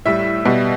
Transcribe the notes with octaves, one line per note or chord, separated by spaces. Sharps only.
A2 G3 E5
B2 G3